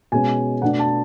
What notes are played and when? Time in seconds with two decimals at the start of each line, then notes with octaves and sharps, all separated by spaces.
0.12 B2 G#3 C#4 G#5
0.62 B2 A3 D4 F#5
0.79 A5